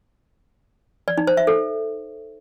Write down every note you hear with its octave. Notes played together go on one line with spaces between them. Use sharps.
D5
D#4
C5
E5
A4